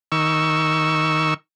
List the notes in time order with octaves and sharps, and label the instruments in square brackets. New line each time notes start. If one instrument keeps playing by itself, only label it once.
[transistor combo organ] D#3 C#6 E6